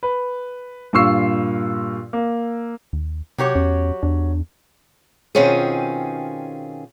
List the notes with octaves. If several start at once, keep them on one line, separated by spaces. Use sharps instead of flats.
B4
G2 A#2 F4 C#6 E6 C7
A#3
D#2
C3 F#3 G4 C#5
E2 C#4
E2 D4
B2 D#3 C4 C#4 F4 G#4